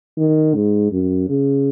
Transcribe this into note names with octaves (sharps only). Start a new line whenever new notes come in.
D#3
G#2
F#2
C#3